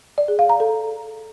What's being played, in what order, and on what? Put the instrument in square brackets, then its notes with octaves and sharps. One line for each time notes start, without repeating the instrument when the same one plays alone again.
[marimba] D5
G#4
F5
A#5
A4